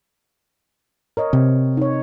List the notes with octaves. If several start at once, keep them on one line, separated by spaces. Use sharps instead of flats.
A#4 C#5 D#5
C3 C4
D#4 C#5